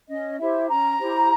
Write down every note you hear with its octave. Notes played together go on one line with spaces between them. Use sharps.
C#4 D#5
E4 G4 C5 E5
C#4 A#5
E4 G4 C5